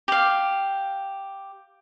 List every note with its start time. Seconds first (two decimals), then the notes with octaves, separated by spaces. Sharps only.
0.08 G4 F5